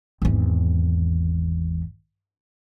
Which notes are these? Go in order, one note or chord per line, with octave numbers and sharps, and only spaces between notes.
G#1 E2